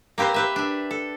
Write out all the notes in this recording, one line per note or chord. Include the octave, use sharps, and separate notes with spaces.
A#3 C4 G4 B4 C5
G4 B4 E5
D4 E5
A4